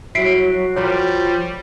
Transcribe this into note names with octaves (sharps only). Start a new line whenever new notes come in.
F#3 E4 F#4 B6 C7 D7
F3 G3 F4 A#4 C#5